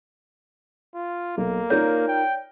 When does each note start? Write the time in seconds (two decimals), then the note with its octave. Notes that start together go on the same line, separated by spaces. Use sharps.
0.95 F4
1.38 B1 A#3
1.70 D#4 F4 A#4 C#5 D5 G6
2.08 G5